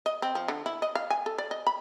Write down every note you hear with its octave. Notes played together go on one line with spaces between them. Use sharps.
D#5
C4
F3
D3
E4
D#5
F5
G#5
A4
D5
D#5
B5